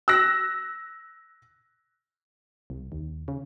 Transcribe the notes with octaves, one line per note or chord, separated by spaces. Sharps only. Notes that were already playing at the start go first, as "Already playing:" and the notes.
E6 F#6 A#6
C2
D#2
C#3